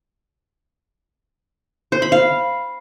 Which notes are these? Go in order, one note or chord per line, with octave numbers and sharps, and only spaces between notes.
C5
B5
F5